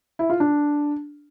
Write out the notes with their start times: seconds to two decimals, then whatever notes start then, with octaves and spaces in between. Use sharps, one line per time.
0.19 E4
0.30 F4
0.40 D4